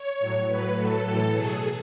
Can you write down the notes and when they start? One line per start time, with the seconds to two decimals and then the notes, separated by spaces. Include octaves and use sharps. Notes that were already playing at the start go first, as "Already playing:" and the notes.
Already playing: C#5
0.20 A2 F#3
0.47 A2 F#3 B4
0.77 A2 F#3 A4
1.06 A2 E3 A4
1.34 B2 F#3 G#4